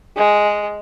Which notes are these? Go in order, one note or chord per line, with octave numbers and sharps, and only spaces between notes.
G#3